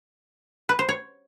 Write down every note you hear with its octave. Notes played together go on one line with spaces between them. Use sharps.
B4
C5
C#5